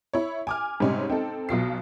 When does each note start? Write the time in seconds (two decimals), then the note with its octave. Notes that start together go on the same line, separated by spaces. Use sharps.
0.13 E4 C#5
0.47 G#5 D6 F6
0.80 G#2 C3 G3 C#4 D#4
1.10 C4 D#4 A4
1.49 B1 B2 F4 C7